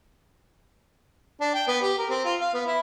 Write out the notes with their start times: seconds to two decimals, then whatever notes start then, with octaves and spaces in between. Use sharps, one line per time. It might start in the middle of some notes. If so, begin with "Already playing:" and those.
1.41 D4
1.55 G5
1.68 B3
1.82 G4
1.98 A#4
2.10 C4
2.25 F4
2.41 F5
2.54 B3
2.67 E4